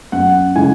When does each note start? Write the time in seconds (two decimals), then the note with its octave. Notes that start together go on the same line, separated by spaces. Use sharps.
0.12 F#2 F#5
0.55 C#3 G#3 E4 G#5